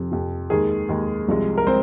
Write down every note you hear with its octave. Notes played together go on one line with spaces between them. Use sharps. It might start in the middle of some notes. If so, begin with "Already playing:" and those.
Already playing: F2 C3 F3
F2 C3 F3
D#2 D#3 G#3 G#4
D#2 D#3 G#3
C2 C3 F3 G#3
A#4
G#3 C4 C5